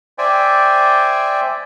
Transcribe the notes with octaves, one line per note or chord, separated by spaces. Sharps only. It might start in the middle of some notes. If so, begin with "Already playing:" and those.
C5 D5 E5 G5 G#5